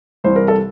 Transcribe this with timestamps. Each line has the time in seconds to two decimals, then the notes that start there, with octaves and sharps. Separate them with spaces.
0.24 C2 C3 E3 C5
0.36 A#4
0.48 A4